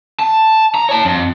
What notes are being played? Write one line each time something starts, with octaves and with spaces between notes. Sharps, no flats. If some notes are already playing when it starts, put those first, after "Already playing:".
A5
A#5
C#5 A5
F2